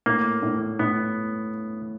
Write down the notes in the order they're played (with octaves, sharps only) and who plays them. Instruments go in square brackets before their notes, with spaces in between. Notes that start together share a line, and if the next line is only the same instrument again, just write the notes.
[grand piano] A2 [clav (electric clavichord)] A#3
[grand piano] A2
[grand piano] A2 [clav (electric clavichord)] B3